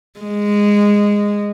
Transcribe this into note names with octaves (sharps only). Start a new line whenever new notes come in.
G#3